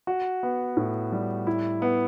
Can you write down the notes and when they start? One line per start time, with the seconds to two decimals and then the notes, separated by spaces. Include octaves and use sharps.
0.07 F#4
0.43 B3
0.77 A2
1.12 G3
1.47 E4
1.82 B3